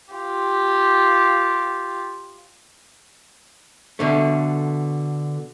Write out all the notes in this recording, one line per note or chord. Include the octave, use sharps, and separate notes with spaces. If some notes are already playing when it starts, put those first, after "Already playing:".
F4 G4
B2 D3 A3